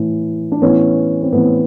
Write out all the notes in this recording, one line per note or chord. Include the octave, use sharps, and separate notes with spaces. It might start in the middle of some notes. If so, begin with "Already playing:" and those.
Already playing: A2 E3
D4
A2 E3 B3 C#4
C4
A2 E3 B3